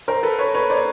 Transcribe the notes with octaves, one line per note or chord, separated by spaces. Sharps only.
A#4 C5
A4 B4
B4 C#5
B4 C#5
C5 D5